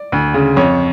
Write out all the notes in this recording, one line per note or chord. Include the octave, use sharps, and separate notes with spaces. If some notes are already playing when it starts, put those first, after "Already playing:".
Already playing: D5
D2
C#3
F2 C#5